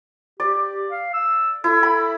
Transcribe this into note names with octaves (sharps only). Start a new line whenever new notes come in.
G4 D5
F5
E6
E4 A4
B5